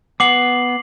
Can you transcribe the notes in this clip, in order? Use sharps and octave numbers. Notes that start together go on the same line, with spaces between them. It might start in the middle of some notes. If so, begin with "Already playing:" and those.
B3 F#5 D6 C7 F#7